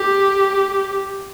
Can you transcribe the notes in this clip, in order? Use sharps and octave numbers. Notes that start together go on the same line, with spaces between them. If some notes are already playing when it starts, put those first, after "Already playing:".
Already playing: G4